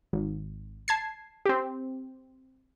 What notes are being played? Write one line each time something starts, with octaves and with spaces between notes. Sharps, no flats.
G#1
A5 G#6 C7
C4 G4